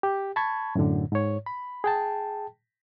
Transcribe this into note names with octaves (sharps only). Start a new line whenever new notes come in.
G4
A5 B5 C#6 G#6
F#2 A2 D3
G#2 C#5
B5
G#4 G5 A5